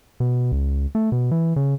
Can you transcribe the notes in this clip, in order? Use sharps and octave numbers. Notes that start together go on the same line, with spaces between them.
B2
C#2
A3
B2
E3
C#3